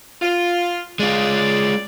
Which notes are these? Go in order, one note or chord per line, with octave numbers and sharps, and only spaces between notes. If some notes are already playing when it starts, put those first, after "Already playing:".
F4
G#3 F4 G#4 D5